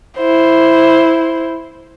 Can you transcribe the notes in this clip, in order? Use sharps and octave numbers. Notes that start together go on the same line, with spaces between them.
E4 C5